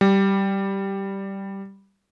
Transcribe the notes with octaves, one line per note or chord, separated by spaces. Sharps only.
G3